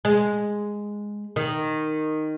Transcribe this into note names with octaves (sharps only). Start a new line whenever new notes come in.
G#3
D#3